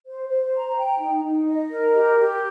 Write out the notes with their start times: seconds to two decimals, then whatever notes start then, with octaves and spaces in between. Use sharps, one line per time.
0.05 C5
0.29 C5
0.53 A#5
0.76 G5
0.99 D#4
1.24 D#4
1.47 D#5
1.71 A#4
1.95 G4
2.19 G4